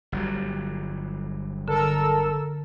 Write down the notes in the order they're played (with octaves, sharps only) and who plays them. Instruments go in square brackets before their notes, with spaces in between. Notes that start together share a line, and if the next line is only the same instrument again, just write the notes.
[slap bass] G1 F#3 G3
[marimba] D3 [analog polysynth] A4 A#4 E6